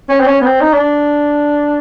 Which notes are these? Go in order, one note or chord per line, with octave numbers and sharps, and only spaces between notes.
C#4
C4
C#4
B3
C4
D#4
D4